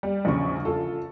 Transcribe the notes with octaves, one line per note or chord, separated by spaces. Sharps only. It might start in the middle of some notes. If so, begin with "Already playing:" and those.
G3
A#1 E2 C#3 C#6
F4 A4